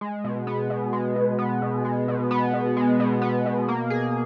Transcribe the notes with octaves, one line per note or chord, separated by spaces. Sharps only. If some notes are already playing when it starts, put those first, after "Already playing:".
G#3
B2
B3
B2
G#3
B2
B3
B2
G#3
B2
B3
B2
G#3
B2
B3
B2
A#3
G#4